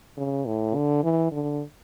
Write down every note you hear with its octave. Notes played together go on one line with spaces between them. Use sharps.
C#3
A2
D3
E3
D3